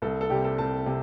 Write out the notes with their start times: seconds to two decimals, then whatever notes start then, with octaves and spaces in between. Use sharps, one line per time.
0.02 C2 A4
0.21 A4
0.30 C3 G3 C4 G4
0.44 A4
0.58 C2 A5
0.86 C3